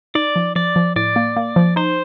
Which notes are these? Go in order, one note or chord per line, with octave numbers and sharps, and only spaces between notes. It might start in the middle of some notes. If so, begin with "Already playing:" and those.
D#4 D5
F3
F3 D5
F3
A2 D5
A#3
A#3
F3
D#4 C5